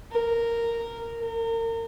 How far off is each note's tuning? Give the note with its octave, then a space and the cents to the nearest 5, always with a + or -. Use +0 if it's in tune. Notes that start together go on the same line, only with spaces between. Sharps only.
A#4 -10
A#4 -35